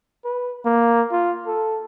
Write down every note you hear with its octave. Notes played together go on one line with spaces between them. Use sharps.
B4
A#3
F4
A4